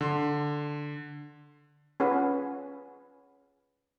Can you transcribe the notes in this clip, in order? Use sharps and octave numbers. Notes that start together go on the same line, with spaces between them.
D3 C6
C#4 F4 G#4 B4 F#5